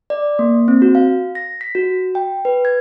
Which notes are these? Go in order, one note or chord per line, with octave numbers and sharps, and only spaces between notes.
D5
A#3
C4
F#4
F5
A#6
B6
F#4
G5
B4
G#6